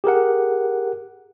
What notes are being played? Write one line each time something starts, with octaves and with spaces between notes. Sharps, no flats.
G4 G#4 A#4 F#5